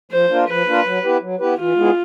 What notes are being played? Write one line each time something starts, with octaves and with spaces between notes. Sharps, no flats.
F3 C5
A#3 D4 F4 A#4
F3 B4
A#3 D4 F4 A#4
F#3
B3 E4 G4 B4
F#3
B3 E4 G4 B4
E3 F4
G#3 B3 E4 G#4